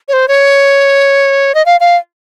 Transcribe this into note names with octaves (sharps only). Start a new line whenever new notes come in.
C#5
C5
C#5
D#5
F5
F5